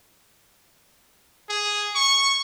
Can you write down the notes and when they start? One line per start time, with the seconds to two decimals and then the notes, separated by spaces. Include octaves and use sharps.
1.49 G#4
1.95 C#6